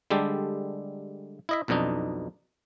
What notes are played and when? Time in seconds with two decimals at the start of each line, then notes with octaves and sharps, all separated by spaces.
0.10 D3 G3 G#3 G4 A4
1.49 E4 D#5 E5
1.68 B1 F2 B2 D4 D#4